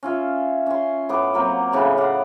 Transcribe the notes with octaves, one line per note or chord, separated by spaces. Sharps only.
C#4 F4 E5
C#4 C6
A2 B3 D6
F#3 A#3 C4
A2 C#3 B3
D5 F5 F#5 B5